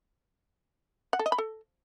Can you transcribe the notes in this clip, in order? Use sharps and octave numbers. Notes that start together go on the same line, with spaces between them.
F#5
A4
D#5
B5
A4